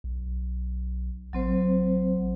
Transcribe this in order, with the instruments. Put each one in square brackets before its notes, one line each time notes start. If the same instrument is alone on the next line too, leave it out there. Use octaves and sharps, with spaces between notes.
[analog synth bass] B1
[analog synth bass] A1 [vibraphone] F#3 C4 C5